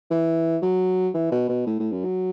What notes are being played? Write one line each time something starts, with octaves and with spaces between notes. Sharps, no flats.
E3
F#3
E3
B2
B2
A2
A2
F#2
F#3